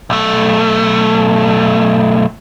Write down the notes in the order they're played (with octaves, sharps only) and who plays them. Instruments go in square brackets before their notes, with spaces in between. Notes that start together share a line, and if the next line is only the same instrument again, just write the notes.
[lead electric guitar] B1 A3